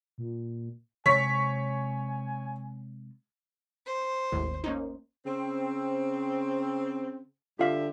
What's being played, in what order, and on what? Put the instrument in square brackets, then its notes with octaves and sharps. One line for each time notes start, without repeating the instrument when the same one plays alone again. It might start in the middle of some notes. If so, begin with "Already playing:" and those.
[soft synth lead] A#2
[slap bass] C3 G#3 [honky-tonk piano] C#5 B6 [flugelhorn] G#5
[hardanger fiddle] C5
[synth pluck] G#1 D#2 A2
A#3 C#4 D#4
[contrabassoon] C#3 [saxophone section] C4
[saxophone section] G2 G4 E5 [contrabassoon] D3 [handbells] F4 F5 B6